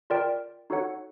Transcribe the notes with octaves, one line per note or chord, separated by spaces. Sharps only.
F4 A#4 D5 G5
D#4 F#4 A4 C#5 F#5